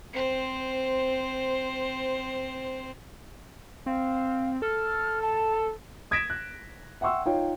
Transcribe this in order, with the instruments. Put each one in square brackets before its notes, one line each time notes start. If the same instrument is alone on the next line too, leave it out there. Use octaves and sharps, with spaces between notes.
[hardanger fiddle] C4 C5
[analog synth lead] C4 [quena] F5
[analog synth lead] A4 [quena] F6
[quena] A5
[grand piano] D#6 G#6 A#6 B6 D7 E7
F#6
E5 F#5 G5 C6 C#6 E6
D#4 F4 C#5 G5